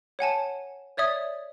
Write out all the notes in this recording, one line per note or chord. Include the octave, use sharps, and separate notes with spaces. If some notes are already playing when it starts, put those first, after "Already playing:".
C#5 F#5 G#5 A5
C#5 D5 E5 D#6 G#6